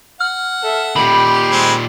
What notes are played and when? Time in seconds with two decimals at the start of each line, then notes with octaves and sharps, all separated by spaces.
0.20 F#5 F6
0.62 A4 E5
0.96 A#2 D#3 G4 B5
1.51 G#3 C4